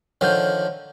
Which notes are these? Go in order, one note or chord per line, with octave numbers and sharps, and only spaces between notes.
D3 D#3 F3 C#5 F6 G6